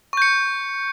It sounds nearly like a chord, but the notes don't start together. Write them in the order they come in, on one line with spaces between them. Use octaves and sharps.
C#6 G6 C#7